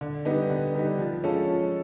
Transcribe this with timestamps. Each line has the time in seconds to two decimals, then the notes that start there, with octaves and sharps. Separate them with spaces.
0.01 D3
0.25 G3 B3 D#4
0.50 D3
0.75 G3 B3 D#4
0.99 F3
1.24 G#3 C#4 F4 A4
1.48 F3